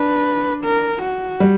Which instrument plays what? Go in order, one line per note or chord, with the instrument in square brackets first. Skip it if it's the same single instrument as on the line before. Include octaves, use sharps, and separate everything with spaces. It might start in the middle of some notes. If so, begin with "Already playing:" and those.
Already playing: [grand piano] D4 [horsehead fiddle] B4
[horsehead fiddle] A#4
F#4
[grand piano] G3